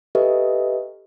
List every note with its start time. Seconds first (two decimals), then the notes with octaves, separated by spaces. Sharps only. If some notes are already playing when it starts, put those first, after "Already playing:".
0.15 G4 A4 B4 D#5 E5